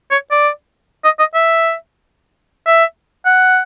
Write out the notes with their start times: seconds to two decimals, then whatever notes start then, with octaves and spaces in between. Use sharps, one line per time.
0.11 C#5
0.31 D5
1.05 D#5
1.19 D#5
1.34 E5
2.67 E5
3.26 F#5